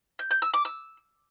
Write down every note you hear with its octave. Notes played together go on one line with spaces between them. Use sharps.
G6
G6
E6
D6
E6